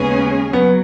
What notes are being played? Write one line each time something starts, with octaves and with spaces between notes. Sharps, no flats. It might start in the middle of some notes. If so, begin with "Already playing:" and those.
Already playing: D#2 C#3 G#3 B3 C#4 G#4
F#3 B3